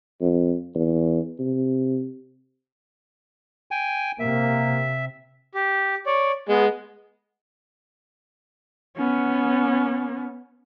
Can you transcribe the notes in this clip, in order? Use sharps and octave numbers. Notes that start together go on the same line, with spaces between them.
F2
E2
C3
G5 G#5
C3 A#3 E5
G4
C#5 D5
G#3 B3
B3 C#4